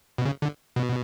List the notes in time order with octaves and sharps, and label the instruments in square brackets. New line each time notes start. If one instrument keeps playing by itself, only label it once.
[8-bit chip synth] B2
C#3
D3
B2